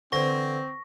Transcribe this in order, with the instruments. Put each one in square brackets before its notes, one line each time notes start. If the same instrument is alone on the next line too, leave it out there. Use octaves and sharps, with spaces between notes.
[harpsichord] D3 E3 [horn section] C4 [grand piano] C5 [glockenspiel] C#6 A#6